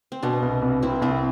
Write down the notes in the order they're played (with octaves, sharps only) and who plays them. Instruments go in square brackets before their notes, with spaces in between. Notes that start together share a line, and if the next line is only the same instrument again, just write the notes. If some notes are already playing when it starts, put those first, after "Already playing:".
[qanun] C4
[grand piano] B2 [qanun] B3 D4
[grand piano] C2
C2
[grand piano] C2 [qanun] C4 E4
[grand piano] C2 [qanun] C4 E4